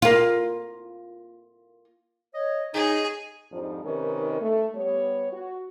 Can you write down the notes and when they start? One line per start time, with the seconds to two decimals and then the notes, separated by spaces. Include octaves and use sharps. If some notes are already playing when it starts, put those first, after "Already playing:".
0.02 A#3 F4
2.34 C#5 D#5
2.74 G#3 D#4 G#4 C#5 D#5
3.51 F2 G#2 F3 G3 D4 D#4
3.84 C3 D#3 C#4 D#4 A#4 B4
4.40 A3
4.75 G3 B3 C#5
5.31 F#4